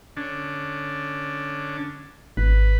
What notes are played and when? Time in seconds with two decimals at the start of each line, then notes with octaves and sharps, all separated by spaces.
0.17 D3 C#4 D4
2.37 G#1 B4